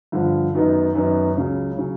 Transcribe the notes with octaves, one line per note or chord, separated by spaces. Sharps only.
G2 D3 F3
F#2 D#3 F#3 B3 D#4
F#2 D#3 F#3 B3 D#4
C#2 C#3 F#3
C#3 F#3